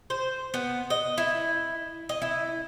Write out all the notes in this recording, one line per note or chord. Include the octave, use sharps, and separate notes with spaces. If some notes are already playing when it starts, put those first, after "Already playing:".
C5
B3
D#5
E4
D#5
E4